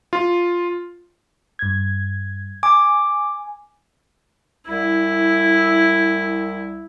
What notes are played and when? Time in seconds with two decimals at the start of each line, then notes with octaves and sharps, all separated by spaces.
0.13 F4
1.59 G2 G#6
2.63 G#5 D6
4.68 C2 E4